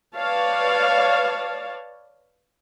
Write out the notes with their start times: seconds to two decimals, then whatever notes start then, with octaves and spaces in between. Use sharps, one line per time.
0.15 B4 C#5 D5 F5 A5